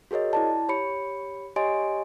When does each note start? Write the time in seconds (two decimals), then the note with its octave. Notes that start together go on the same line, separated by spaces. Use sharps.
0.11 F#4 G#4 A#4 C#5 D#5
0.33 E4 D5 A5
0.69 G4 C#5 B5 C#7
1.56 G4 C#5 D#5 G#5 C6 D7